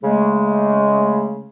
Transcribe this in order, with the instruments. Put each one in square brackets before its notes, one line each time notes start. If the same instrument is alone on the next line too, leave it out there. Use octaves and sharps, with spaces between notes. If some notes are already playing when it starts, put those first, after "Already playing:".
[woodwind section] C#3 G#3 A3